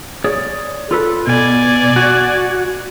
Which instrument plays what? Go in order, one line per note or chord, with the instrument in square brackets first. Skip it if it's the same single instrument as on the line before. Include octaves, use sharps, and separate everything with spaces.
[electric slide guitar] G#4 C#5 D5
F4 A4 B4
[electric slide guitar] B2 [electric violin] D5 G#5
[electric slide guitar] F#4